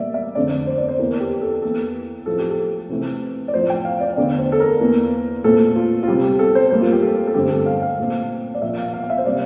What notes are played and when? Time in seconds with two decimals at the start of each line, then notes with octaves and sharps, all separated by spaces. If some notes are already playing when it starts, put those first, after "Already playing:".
Already playing: A2 G3 A#3 D5 E5
0.14 E5
0.35 F2 D3 A3 C4 D5
0.67 C5
0.78 D5
0.88 C5
0.99 E2 E3 A#3 A#4
1.20 G4
1.42 A4
1.63 E2 E3 A#3 A4
2.26 A2 F3 A3 C4 A4
2.39 G4
2.51 A4
2.89 C3 E3 A3 C4
3.48 D5
3.54 A2 F3 C4 C5
3.70 G5
3.85 F5
4.01 D5
4.16 E2 D3 A3 D5
4.38 C5
4.52 A4
4.60 A#4
4.81 E2 E3 A#3
5.44 A#2 A3 C4 A4
5.76 F4
6.03 F4
6.08 C3 G3 C4 G4
6.23 G4
6.39 A4
6.55 C5
6.71 A2 G3 A#3 C5
6.82 F4
6.92 G4
7.02 A4
7.27 A4
7.34 G2 D3 A3 C4 G4
7.51 A4
7.66 F5
7.82 F5
7.99 A#2 A3 C4
8.55 D5
8.62 A#2 F3 A#3 E5
8.78 F5
8.93 F5
9.03 F5
9.10 E5
9.18 C5
9.25 C3 G3 A#3 D5